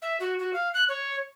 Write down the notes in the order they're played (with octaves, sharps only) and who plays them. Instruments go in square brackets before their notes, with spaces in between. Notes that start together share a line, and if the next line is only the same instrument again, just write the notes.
[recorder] E5
F#4
F#4
F5
F#6
C#5